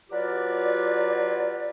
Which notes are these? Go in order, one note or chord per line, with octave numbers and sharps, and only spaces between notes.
F#3 F4 G4 B4 D5